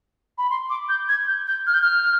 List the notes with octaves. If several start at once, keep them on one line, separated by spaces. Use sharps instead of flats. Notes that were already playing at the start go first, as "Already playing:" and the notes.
B5
C6
D6
G6
G#6
G6
G6
F6
G6
F6